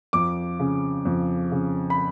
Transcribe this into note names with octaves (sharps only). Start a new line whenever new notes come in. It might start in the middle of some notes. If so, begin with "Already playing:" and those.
F2 D6
C#3
F2
C#3
B5